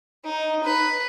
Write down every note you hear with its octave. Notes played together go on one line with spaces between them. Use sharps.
D#4
B4